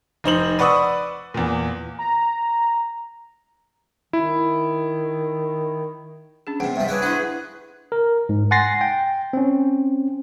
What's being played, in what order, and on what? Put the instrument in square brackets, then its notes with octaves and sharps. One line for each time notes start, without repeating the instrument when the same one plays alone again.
[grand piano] F1 D#4 C5 F#7
B4 D5 F#5 C#6 D#6 E6
E2 A#2
[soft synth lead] A#5
[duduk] D#3 [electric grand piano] E4
[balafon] C#4 D4 G#4
[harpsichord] E2 C3 [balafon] F#5
[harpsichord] G2 F3 [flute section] E5
[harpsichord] C#4 D4 E4 [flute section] G#4 B4
[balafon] D4 E4 [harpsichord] F#4 C5
[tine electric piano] A#4
G#2
F#5 G#5 C6 A6 A#6 C7
G5
C4 C#4